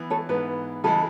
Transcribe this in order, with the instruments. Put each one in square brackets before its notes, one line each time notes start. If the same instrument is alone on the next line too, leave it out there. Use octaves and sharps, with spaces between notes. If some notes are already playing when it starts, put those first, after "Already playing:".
Already playing: [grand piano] E3 B3
[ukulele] A4 C#5
[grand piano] G#2 E3 B3 [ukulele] B4
[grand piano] C#3 E3 G#3 [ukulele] A4